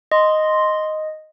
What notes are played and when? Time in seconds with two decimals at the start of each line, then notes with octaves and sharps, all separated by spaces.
0.12 D#5 C6